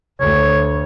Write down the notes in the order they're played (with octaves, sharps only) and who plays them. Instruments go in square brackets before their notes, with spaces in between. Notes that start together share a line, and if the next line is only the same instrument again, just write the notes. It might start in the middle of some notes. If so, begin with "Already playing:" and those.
[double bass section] D2 [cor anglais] C#5